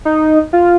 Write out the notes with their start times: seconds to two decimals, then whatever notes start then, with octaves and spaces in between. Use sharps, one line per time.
0.05 D#4
0.53 F4